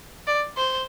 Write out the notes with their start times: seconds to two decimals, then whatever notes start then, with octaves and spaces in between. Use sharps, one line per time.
0.27 D5
0.58 C5